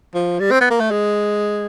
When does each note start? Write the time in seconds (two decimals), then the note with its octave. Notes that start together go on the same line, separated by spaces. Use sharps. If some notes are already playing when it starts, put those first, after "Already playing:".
0.14 F3
0.40 G3
0.51 C4
0.61 B3
0.70 A#3
0.80 A3
0.91 G#3